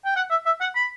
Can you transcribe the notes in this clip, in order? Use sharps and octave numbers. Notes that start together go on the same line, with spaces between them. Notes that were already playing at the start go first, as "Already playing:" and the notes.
G5
F#5
E5
E5
F#5
B5